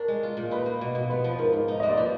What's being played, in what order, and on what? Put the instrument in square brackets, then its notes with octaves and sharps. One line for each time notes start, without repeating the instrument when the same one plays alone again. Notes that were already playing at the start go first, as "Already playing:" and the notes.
Already playing: [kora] D4 F#4 [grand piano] A#4
[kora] G#3
F4
A#2
[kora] D#4 [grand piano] B4
[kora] A#3
B2
B2
[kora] B3 [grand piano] B4
[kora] F3
[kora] G#2 [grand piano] A#4
[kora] G#2
D#4
[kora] A#3 [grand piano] D#5
[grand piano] D5
[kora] F3 [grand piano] B4